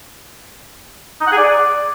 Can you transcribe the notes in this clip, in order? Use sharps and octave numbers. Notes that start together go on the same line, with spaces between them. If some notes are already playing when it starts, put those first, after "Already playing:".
D#4
F#5
G#4
D5